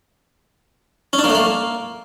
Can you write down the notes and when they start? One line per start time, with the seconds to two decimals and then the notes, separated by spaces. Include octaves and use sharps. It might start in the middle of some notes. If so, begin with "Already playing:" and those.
1.13 C#4
1.19 D4
1.24 A#3
1.30 A3
1.35 A#3